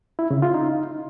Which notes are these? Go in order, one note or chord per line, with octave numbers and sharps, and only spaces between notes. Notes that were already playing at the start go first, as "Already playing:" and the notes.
E4
C#3
F4
D#4